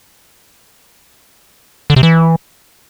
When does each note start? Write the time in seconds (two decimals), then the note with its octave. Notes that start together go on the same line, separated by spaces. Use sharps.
1.90 D3
1.96 C3
2.03 E3